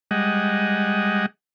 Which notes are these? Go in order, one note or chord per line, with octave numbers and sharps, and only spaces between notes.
G3 G#3 D#5 F#5